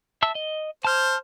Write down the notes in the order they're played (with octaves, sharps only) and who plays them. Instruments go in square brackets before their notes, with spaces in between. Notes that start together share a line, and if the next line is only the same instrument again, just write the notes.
[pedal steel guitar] E5 A5 E6
D#5
[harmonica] C5 [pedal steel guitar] A5 F6